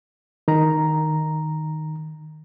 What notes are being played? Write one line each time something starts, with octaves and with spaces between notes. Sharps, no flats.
D#3 A#5